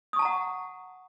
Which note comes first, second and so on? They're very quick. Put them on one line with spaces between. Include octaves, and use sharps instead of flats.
D#6 C#6 A5 A#5 F#5